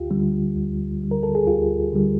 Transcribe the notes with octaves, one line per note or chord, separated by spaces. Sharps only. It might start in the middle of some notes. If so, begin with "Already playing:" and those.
Already playing: D2 F4 G4
D3 G3
D2
D3 G3
A#4
A4
G#4
D2 F4 G4
D3 G3